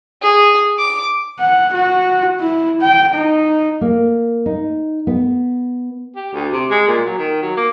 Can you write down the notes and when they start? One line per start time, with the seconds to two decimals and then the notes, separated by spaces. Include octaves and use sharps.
0.22 G#4
0.79 D6
1.39 F#5
1.74 F#4
2.40 E4
2.81 G5
3.14 D#4
3.81 A#3
4.46 D#4
5.07 B3
6.16 G4
6.34 D2
6.53 C3
6.70 G#3
6.88 A#2
7.05 F#3
7.18 D#3
7.42 F#3
7.57 A#3